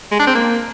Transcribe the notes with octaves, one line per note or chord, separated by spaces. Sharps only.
G#3
D4
C4
A#3